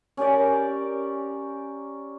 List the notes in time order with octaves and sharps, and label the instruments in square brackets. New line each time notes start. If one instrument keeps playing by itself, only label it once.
[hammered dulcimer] C#4 G4 A#4 D5